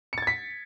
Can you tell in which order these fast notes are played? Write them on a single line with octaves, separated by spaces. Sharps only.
C#7 A6 G#6 B6